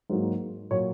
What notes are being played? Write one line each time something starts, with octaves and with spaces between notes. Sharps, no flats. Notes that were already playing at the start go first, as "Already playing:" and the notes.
G#2 F#3 A#3
A#2 F#3 A#3 C#5